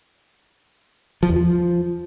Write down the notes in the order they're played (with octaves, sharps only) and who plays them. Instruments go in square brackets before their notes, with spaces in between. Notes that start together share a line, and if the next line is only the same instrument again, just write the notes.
[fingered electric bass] F3
E2
F3